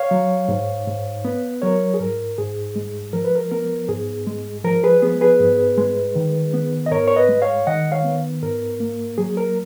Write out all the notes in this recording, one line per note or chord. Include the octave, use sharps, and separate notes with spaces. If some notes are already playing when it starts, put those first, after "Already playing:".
Already playing: C#5 F5
F#3
G#2
G#2
B3
F#3 A#4 C#5
G#4
G#2 A#4
G#2 G#4
G#3
F3 A#4
B4
A#4
B3 A#4
G#2 G#4
G#3
F3 A#4
G#4 B4
B3 G#4
G#4 B4
G#2
G#3
D#3
B3
D#5
G#2 A#4 C#5
C#5
B4 D#5
G#3
C#5 F5
D#3 D#5 F#5
C#5 F5
B3
G#2 A#4
A#3
F#3 G#4
A#4